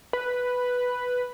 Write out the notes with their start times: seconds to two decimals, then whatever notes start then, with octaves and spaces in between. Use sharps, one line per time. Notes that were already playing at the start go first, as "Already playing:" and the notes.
0.13 B4